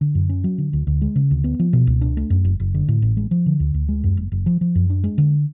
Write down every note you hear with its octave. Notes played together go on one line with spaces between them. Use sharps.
D3
F#2
C#4
F#3
D3
D2
D2
G#3
C#3
D2
B3
F3
B2
C#2
D4
A3
F#2
F#1
F#1
D3
A2
A1
G#3
F3
D3
D2
D2
G#3
F#2
F#1
F#1
F3
F3
F#2
D4
G#3
D3